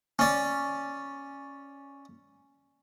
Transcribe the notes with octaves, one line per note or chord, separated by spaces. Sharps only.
C#4 D5